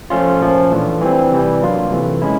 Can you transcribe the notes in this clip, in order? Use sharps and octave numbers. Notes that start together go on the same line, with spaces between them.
F3 A3 C#4 F4
A#2 F3 A#3 C#4
E3 A3 D4 F4
E3 G3 C4
C3 E3 G3
F#3 A#3 D4 F4
C3 E3 A3
G#3 C#4 E4